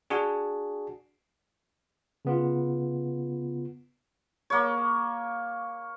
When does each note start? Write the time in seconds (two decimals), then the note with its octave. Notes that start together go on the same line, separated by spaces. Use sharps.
0.10 D4 F#4 G#4
2.25 C#3 B3 F4
4.50 A#3 C#5